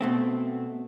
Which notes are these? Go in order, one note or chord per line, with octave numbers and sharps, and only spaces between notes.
B2 A3 C4